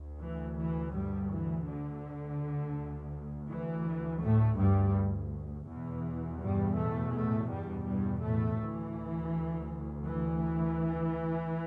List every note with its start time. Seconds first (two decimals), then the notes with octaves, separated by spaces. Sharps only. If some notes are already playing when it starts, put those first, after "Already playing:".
Already playing: D2
0.21 E3
0.57 E3
0.93 G2 G3
1.30 E3
1.66 D3
2.76 D2
3.49 E3
4.22 A2 A3
4.58 G2 G3
5.67 E2 B2 E3
6.41 G2 G3
6.77 A2 A3
7.13 A2 A3
7.50 G2 G3
7.86 G2 G3
8.23 A2 A3
8.59 D2 E3
10.05 E3